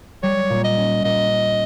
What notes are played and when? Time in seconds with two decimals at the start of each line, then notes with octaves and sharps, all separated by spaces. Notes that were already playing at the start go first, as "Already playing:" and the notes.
0.23 G3 C#5
0.50 A#2
0.64 D#5
0.77 C#4
1.04 A#2 D#5
1.31 C#4